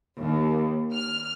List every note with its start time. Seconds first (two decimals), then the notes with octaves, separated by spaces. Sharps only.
0.19 D#2
0.94 F6